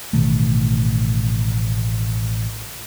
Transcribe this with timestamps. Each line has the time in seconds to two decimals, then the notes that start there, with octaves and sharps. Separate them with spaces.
0.13 A1 B2 D#3 A3